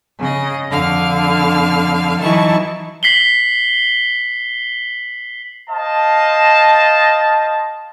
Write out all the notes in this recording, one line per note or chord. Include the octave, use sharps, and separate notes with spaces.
C#3 D#5
F2 D3 F5 F6
E3 F#3 D#4 E4 A5 C#6
B6 C7 F#7 G7
C5 D#5 F5 A5